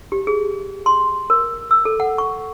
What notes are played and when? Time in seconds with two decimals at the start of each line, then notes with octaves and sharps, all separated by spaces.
0.12 G4
0.27 G#4
0.86 C6
1.30 A#4
1.71 E6
1.85 A4
2.00 F#5
2.18 C#6